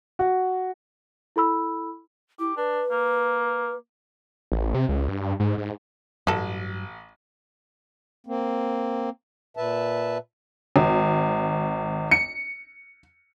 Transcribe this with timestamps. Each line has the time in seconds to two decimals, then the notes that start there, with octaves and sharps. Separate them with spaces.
0.19 F#4
1.36 E4 A4 B5 E6
2.39 E4 G4
2.57 D4 B4
2.91 A#3
4.52 A1
4.74 C3
4.89 C#2
5.09 G2
5.21 G2
5.40 G#2
5.58 G#2
6.27 A1 G2 F#3 F#4 A4
8.27 A#3 C4
9.57 A#2 B4 E5 A5
10.76 G#1
12.11 C#7